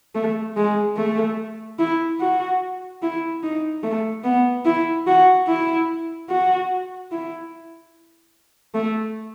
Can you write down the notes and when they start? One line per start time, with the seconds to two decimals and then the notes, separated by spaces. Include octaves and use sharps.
0.15 A3
0.56 G#3
0.97 A3
1.79 E4
2.20 F#4
3.02 E4
3.43 D#4
3.83 A3
4.24 B3
4.65 E4
5.07 F#4
5.47 E4
6.30 F#4
7.11 E4
8.75 A3